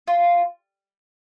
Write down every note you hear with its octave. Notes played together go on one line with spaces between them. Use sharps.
F4